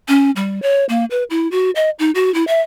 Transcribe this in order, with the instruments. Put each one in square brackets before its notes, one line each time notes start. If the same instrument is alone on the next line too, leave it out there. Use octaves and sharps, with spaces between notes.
[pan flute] C#4
G3
C#5
A#3
B4
E4
F#4
D#5
D#4
F#4
E4
E5